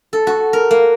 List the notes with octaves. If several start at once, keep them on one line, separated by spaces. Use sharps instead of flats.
A4
F#4
A#4
A#3